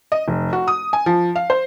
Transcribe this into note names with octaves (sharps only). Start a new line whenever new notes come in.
D#5
F1
F#4
D#6
G#5
F3
F5
C5